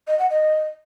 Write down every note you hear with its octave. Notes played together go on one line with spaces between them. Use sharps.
D#5
F#5
D#5